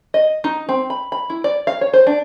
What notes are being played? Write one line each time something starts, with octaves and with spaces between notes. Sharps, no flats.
D#5
D#4
C4
B5
B5
E4
D5
F5
C#5
C5
D4